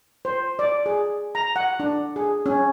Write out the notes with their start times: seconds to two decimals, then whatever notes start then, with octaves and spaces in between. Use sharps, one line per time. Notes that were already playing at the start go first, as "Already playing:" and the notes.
0.25 C5
0.59 D5
0.86 G#4
1.35 A#5
1.56 F#5
1.80 D4
2.16 G#4
2.46 C#4